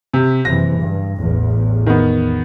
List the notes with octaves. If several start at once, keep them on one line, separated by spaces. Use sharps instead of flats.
C3
F#1 C3 E3 A#6
G2
A1 E2
D#3 B3